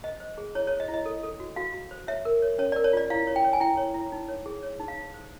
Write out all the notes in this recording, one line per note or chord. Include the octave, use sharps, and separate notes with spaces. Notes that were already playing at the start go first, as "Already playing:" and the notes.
C5 D#5
C5
G#4
E4 C#5
C#5
C5
D#5
E4
D#5
A4
A4
F#4
F#4 F5
F#4
C5
C#5 E5
A#4
C#5
C#4 C#5
D5
A#4
C#5
F4 D5
E4 F5
C#5
G5
C#5
G#5
E4 G5
C#5
E4
D#4
C#5
G#4
C#5
D#4
F5
D#4
C5